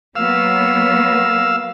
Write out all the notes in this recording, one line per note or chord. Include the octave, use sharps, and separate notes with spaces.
F#3 A#3 B3 F5 E6